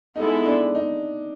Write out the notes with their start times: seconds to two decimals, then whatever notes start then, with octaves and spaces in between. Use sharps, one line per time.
0.16 G#3 B3 D#4 E4 A4
0.46 D4
0.75 D#4